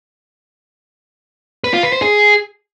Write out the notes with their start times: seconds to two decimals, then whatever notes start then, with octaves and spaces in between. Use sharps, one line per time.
1.64 B4
1.74 F4
1.83 B4
1.93 C5
2.02 G#4